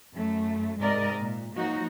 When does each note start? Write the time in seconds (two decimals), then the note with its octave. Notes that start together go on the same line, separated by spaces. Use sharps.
0.12 F#2 A3
0.80 G#2 C3 G#3 A#4 D5 D#5
1.20 A#2
1.55 F3 F#3 A#3 D#4 F#4